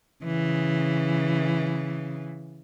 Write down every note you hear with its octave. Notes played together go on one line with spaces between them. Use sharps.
C#3 E3